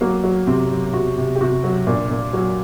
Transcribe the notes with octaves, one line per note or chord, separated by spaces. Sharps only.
F#3 A#3
F#3
C3 C4
F#3
C3 F#4
C3
G4
C3 F#4
F#3
A#2 D4
A#2
F#3